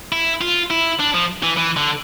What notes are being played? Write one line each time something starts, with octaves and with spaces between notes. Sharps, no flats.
E4
F4
E4
D4
F3
E3
E3
D3